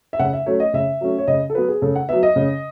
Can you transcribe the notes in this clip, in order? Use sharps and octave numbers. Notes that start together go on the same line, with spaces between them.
E5
C#3 F#5
E5
F#3 A3 C#4 C#5
D#5
C#3 E5
F#3 A3 C#4
C#5
C#3 D#5
A4
F#3 B3 B4
G#4
C#3 A4
F#5
F#3 B3 E5
D#5
C#3